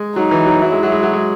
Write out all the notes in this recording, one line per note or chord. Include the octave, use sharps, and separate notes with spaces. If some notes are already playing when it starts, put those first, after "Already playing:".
Already playing: G#3
F#3 D#4
E3
F#3
F#3 E4
G#3
F#3
G#3
F#3
G#3